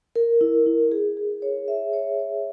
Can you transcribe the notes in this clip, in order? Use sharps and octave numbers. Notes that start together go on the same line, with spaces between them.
A#4
E4
E4
G#4
G#4
C#5
E5
C#5
C#5